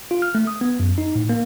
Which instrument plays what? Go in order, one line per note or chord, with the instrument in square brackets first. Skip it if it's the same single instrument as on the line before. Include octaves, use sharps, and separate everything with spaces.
[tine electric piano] F4
F6
A3
D#6
B3
F#2
D#4
A2
A#3